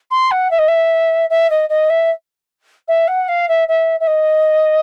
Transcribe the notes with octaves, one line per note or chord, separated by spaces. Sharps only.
C6
F#5
E5
D#5
E5
E5
D#5
D#5
E5
E5
F#5
F5
E5
E5
E5
D#5